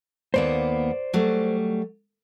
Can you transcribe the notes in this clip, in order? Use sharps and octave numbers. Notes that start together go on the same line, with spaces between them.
D#2 A#3 B3 C5 D5
F#3 G3 A3